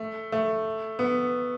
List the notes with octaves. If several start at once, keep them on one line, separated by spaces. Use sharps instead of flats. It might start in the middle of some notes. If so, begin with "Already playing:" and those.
Already playing: A3
A3
B3